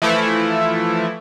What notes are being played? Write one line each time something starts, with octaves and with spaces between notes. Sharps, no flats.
E3 F3 A3 E4